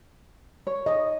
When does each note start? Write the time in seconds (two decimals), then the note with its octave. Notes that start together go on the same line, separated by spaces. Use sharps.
0.67 C#5
0.86 D#5